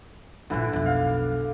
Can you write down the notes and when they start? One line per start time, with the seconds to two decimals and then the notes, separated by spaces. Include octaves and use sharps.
0.50 A#1 D3 E3 E4 F4
0.73 B1 F2 D5
0.86 F5